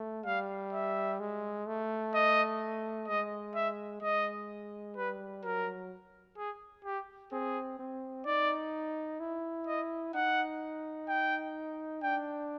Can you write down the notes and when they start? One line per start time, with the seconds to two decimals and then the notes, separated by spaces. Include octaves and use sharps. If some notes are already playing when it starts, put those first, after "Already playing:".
Already playing: A3
0.25 G3 F5
0.73 E5
1.20 G#3
1.67 A3
2.14 D#5
3.08 G#3 D#5
3.55 E5
4.02 G#3 D#5
4.97 G3 B4
5.44 F#3 A#4
6.37 G#4
6.85 G4
7.32 C4 G#4
7.79 C4
8.26 D#4 D5
9.20 E4
9.67 D#5
10.14 D#4 F#5
11.09 G5
12.03 D4 G5